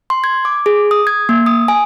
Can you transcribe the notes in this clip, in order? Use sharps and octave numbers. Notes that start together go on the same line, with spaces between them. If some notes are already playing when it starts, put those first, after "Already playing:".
C6
G#6
D6
G#4
D#6
G#6
A#3
D#6
G#5